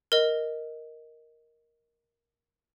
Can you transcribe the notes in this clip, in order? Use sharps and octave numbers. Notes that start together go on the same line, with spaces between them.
A#4 D#5